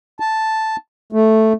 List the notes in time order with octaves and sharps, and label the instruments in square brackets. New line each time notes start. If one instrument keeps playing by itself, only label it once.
[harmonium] A5
A3